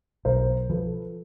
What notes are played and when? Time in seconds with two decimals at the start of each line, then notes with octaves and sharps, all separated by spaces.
0.25 B1 A#4 C5
0.70 F3 A4 B4